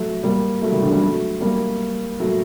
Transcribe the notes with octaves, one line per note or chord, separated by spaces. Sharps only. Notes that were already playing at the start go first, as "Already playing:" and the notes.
Already playing: F#3 A3
G3 A#3
F#3 A3
D#3 G3
D3 F#3
D#3 G3
F#3 A3
G3 A#3
F#3 A3